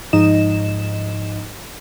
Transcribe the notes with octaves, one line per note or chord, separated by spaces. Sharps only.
G#2 F3 D#4 D#5 E7